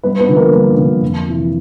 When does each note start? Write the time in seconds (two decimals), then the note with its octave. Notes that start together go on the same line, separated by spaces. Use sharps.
0.03 G2 B3 B4
0.19 B3 B4
0.29 D3 F3
0.37 A#3 A#4
0.53 G2
0.77 D3 F3
1.02 F2
1.27 C3 E3